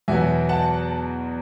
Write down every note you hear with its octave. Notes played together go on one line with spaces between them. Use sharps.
E2 B2 F#3 B3 E5 G#5
F#5 A5